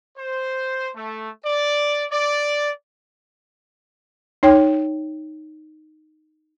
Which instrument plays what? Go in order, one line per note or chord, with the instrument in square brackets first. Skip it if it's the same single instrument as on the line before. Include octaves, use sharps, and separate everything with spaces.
[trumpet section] C5
A3
D5
D5
[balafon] D#4 C#5 G5